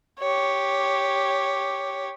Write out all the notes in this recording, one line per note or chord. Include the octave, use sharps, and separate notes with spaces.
G4 C#5